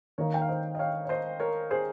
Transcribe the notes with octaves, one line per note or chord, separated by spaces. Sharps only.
D#3 A#3 D#4 A#4 C#5
G5
F5
C5 D#5
D#5
C#5 F5
C#5
C5 D#5
A#4 C#5
G#4 C5